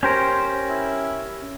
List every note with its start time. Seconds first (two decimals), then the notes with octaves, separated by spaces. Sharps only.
0.03 C#4 G4 A#4 C5
0.69 E4